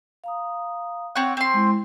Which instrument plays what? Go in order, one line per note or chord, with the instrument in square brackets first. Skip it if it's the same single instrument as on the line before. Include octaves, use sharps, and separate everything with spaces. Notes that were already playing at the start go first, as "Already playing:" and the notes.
[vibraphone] F5 A#5 D#6
[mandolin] C4 C#5 F#5
C4 C6
[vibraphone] G#3 E4